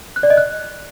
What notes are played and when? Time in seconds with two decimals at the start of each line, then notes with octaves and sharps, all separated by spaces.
0.16 F#6
0.23 D5
0.30 D#5
0.37 F#6